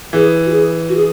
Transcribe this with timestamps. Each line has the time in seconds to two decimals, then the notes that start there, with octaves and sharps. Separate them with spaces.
0.13 E3 G#4
0.46 F#4
0.51 G#4
0.89 F#4
0.96 G#4